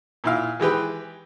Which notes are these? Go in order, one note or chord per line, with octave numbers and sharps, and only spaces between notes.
A#2 E4 F5
E3 G#3 G4 B4